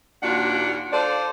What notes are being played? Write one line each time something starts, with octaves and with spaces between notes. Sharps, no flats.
D#2 A#2 D4 F4 F#4 F#5
F4 A4 C5 D5